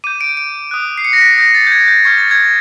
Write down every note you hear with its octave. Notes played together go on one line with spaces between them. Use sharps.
D6 G6 D#7
D7
D7
D#6 F#6
C7
C#7
A#6
B6
D#6 G6 A#6
A6
G6
G#6
G6
C#6 F6 G#6
A6
G#6